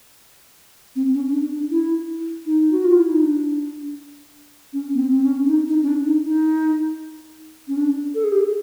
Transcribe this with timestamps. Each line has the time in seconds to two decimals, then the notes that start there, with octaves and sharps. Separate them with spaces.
0.96 C4
1.14 C#4
1.33 D4
1.52 D4
1.71 E4
2.46 D#4
2.72 F#4
2.84 F4
2.97 E4
3.09 D#4
3.23 D4
4.73 C#4
4.94 B3
4.99 C4
5.12 C4
5.24 C#4
5.45 D4
5.50 D#4
5.68 D#4
5.83 C#4
5.88 D4
6.06 D#4
6.26 D#4
7.68 C#4
7.77 D4
8.15 A4
8.24 G#4
8.32 G4
8.40 G#4